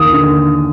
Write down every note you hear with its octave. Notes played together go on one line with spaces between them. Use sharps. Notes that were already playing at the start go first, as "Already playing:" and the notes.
Already playing: D#2 D#6
D3